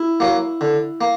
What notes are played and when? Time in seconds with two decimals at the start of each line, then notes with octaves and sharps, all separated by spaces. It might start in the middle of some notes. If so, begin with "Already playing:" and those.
Already playing: E4
0.20 F#3 A#3
0.61 D3
1.01 A#3